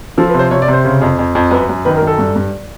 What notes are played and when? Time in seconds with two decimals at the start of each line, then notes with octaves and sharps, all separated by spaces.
0.17 F3 A4
0.29 B4
0.34 C3 C5
0.51 C3 C#5
0.62 D5
0.68 C3 C5
0.85 C#3
1.02 F2
1.19 F2
1.35 F2
1.51 F#2 B4
1.69 F#2
1.85 D#3 B4
1.97 A#4
2.02 F#2
2.07 A4
2.19 G2
2.36 G2